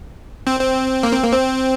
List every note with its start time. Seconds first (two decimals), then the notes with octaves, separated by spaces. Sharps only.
0.47 C4
0.60 C4
1.03 A#3
1.13 C4
1.23 A#3
1.32 C4